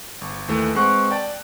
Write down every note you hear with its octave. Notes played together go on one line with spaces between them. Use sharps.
G1
D#2 E3 A3
G#3 C4 B4 F#5 C#6 F#6
D5 G5 A5